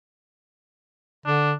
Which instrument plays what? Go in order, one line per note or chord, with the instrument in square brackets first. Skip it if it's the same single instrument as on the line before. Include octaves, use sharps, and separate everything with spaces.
[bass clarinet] D3 [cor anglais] D4